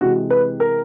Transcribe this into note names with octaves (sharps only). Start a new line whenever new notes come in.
C3 E3 G#3 F#4
B4
A#4